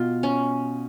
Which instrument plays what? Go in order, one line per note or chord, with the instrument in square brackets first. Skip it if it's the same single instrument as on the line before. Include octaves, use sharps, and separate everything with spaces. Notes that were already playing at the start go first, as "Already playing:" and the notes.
Already playing: [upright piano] B2 [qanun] F4
[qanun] C#4